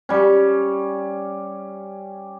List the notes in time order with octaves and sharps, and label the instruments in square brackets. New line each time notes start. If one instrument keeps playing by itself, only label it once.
[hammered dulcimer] G3 C#4